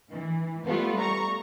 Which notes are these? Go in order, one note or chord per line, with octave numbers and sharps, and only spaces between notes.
E3
G3 A3 B3 F4
A#5 C#6